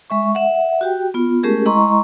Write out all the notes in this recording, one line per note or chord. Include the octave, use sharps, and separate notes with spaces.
G#3 E5 C#6
E5 F#5
F#4 G4 G5
B3 F4
G#3 A3 C#4 G4 G#4 A#4
G#3 E4 D#5 A#5 C6 C#6